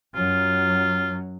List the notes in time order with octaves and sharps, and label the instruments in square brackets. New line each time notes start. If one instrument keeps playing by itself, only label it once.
[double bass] F#2 F#3 [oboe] F4